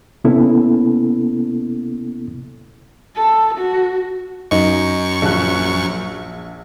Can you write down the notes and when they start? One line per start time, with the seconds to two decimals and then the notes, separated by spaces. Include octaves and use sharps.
0.24 C3 A#3 B3 C#4 E4 A4
3.16 A4
3.57 F#4
4.51 F#2 D#4 C#6
5.22 A#1 F#6